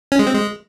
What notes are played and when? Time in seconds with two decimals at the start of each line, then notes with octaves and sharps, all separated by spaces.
0.12 C#4
0.19 G#3
0.27 C4
0.34 G#3